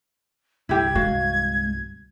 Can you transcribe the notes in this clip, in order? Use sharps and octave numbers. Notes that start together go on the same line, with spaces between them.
C2 G2 D3 E4 G4 G#6
G#3 F#4 F5